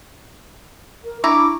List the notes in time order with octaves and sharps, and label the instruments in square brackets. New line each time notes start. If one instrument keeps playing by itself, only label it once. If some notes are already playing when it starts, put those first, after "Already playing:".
[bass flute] A#4
[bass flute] D4 [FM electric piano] E4 [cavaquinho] A#5 [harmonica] C#6 D6